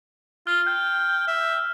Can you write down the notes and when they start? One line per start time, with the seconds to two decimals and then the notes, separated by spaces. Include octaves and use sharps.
0.47 F4 F6
0.67 G5 G6
1.28 E5